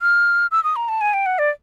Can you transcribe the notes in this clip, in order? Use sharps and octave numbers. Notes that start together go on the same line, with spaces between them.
F6
E6
D#6
A#5
A5
G#5
G5
F#5
D5